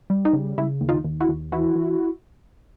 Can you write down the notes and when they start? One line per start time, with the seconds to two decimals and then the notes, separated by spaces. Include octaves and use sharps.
0.10 G3
0.25 D#4
0.33 C#3
0.58 C#3 E4
0.81 D#2
0.89 D#4 F4
1.04 D#2
1.20 E4 F#4
1.29 D#2
1.52 E3 E4 F#4
1.75 E3